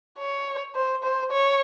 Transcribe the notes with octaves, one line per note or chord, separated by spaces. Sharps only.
C#5
C5
C5
C#5